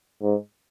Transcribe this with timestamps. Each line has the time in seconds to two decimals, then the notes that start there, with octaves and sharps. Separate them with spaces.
0.22 G#2